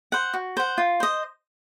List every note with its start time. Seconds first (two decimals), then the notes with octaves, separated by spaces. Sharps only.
0.12 C5 F#5
0.34 F#4
0.57 C5 F#5
0.78 F4
1.00 C5 D#5